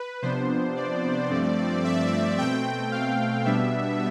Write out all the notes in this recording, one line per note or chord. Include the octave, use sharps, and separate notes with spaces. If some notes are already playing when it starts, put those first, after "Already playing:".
Already playing: B4
C3 F3 B3 D4 C5
D5
G2 F3 A3 C4
E5
B2 A3 C4 G5
F5
B2 G3 B3 D4 E5